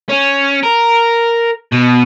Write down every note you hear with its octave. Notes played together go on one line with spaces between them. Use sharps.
C#4
A#4
B2